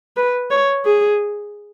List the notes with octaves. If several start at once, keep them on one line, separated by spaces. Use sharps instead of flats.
B4
C#5
G#4